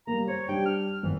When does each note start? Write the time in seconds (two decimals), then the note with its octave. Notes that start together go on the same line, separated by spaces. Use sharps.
0.07 G3 A#3 A#5
0.28 C5 C#5
0.49 G3 D4 G4 G5
0.66 F6
1.03 G#1 E3